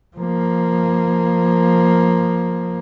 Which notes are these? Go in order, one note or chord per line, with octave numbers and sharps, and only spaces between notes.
F3 A#3